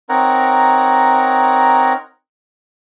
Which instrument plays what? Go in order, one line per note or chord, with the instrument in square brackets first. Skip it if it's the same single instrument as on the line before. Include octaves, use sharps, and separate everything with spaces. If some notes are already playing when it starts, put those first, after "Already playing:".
[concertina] C4 D#4 A#4 C#5 F#5 A#5